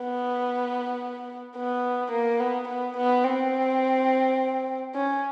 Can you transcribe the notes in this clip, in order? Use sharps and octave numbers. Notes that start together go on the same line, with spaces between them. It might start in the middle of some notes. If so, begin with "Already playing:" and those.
Already playing: B3
B3
A#3
B3
B3
B3
C4
C#4